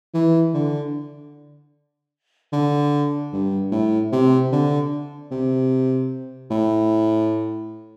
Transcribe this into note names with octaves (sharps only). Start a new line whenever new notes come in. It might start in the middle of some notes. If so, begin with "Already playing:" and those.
E3
D3
D3
G2
A2
C3
D3
C3
A2